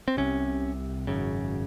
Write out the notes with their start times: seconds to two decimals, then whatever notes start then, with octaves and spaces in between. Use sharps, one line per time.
0.08 C4
0.17 C2 C3 C#4
1.07 G#1 F#2 C#3